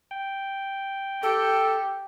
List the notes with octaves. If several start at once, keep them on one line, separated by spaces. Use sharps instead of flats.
G5
G4 A4